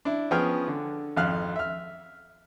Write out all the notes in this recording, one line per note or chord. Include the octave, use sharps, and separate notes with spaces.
D4 E4
F3 B3 C#4 G#4 G5 F6
D3
G#1 F2 F5 F6 F#6
E5 F6